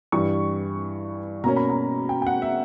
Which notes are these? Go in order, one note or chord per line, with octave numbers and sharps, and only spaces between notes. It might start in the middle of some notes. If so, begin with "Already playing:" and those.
G2 E3 G3 C#6
B2 A#3 C#4 A#5
B5
A#5
G5
G5
F#5
E5